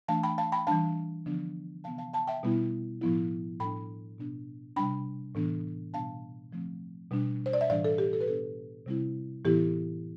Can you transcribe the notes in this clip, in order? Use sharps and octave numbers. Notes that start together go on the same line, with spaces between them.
E3 A3 D4 F5 A5
G5 B5
F5 A5
G5 B5
E3 G3 D4 F5 A5
D3 F3 B3 D4
C3 E3 B3 F5 A5
F5 A5
F5 A5
E5 G5
B2 G3 B3 E4
A2 F3 B3 E4
A2 G3 D4 G5 B5
B2 B3 D4
C3 G3 D4 G5 B5
A2 E3 B3 D4
B2 G3 B3 D4 F5 A5
D3 F3 A3 C4
B2 G3 D4
C5
D5
E5
A2 E3 G3 D4 D5 F5
A4
G4
A4
B4
B2 B3 D4 A4
C3 G3 C4 E4
A2 E3 B3 E4 G4